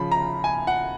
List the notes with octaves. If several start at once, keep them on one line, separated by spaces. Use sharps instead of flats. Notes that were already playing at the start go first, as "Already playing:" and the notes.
Already playing: C#3 F3 B5
A#5
G#5
F#5